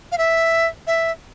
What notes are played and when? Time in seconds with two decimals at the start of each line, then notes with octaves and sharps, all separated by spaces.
0.12 F5
0.18 E5
0.87 E5